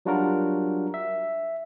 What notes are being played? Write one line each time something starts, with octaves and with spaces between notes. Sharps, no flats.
F#3 G3 D4 F4 F#4 A#4
E5